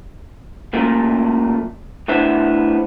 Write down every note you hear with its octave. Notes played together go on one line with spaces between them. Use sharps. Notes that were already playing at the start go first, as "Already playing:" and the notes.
F#2 A#2 A3 A#3
A2 B3 D4 C5 E5